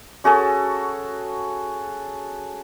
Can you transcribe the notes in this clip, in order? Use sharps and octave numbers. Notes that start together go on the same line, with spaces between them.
C#4 F#4 G#4 A4